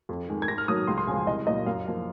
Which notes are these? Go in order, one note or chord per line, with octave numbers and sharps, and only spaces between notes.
F2
D#3 G#3
G#6
G#2 A#6
F6
D#3 F#3 A#3 D#6
C#2 C6
C6
C#3 F3 G#3 G#5
C2 D#5
A#2 F#3 A#3 D#5
F#2 F5
F3 A#3